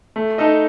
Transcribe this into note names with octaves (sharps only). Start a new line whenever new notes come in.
A3
D#4 A4 D#5